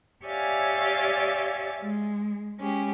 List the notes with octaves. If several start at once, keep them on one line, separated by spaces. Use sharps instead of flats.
G4 C#5 D5 E5 F5 G#5
G#3
G#3 C#4 G4